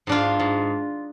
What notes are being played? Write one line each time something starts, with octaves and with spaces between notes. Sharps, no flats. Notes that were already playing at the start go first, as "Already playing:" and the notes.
G#2 D4 F4
G#2